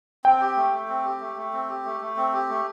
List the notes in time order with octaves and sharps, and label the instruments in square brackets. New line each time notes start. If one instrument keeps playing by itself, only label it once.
[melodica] C4 [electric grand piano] G5
[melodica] G4
A3
A3
C4
G4
A3
A3
C4
G4
A3
A3
C4
G4
A3